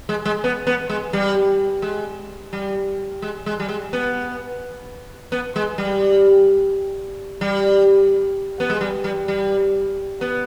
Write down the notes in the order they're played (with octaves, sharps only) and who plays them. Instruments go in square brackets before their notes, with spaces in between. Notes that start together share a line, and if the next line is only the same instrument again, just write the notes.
[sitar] G#3
G#3
B3
B3
G#3
G3
G#3
G3
G#3
G#3
G3
G#3
B3
B3
G#3
G3
G3
B3
G#3
G3
G3
G3
B3